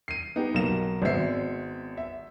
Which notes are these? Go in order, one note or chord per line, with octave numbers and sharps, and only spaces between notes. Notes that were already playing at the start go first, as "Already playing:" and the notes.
C7 D#7
B3 D#4 G4
B1 A#3 A#6 E7
G#1 G#3 B3 C4 E5 C7
E5